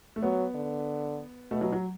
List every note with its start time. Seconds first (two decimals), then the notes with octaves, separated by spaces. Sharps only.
0.16 A3
0.23 F#3 B3
0.55 D3
1.51 B2 A3
1.61 F#3
1.72 F#3